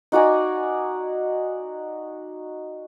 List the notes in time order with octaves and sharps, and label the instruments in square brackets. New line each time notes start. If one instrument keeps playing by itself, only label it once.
[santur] D#4 F#4 D5 G#5